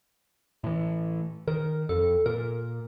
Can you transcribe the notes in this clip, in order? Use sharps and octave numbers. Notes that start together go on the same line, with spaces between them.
A2 E3
D#3 A#4
F2 A4
A#2 A#4